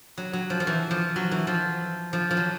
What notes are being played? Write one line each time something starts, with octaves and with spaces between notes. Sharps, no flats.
F#3
F#3
F3
F3
E3
F3
F#3
E3
F3
F3
F3
F#3